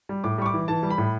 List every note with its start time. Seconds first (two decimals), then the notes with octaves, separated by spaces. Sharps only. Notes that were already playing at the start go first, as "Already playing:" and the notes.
0.09 G3
0.24 A2 D6
0.38 G3 C#6
0.46 D6
0.54 E3
0.68 E3 A5
0.83 G3
0.90 B5
0.98 A2